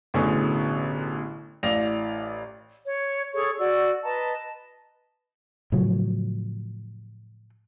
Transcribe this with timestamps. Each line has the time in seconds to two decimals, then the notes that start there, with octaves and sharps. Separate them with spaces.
0.14 A1 B2 D3 C#4 G#4 C#6
1.63 A1 D5 F5 A#6 F7
2.86 C#5
3.33 G#4 A4 C#5 C#6
3.58 F#4 D5 E6
4.04 B4 D#5 A5 A#5
5.72 A2 C#3 F3 F#3